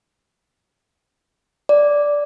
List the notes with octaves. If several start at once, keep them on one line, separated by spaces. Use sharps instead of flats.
D5